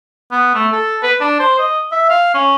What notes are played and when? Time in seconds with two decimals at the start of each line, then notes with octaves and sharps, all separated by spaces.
0.32 B3
0.54 A3
0.72 A4
1.03 B4
1.21 D4
1.39 C5
1.59 D#5
1.92 E5
2.09 F5
2.34 C#4